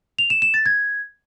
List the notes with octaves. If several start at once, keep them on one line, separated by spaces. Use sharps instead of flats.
F7
E7
E7
A6
G#6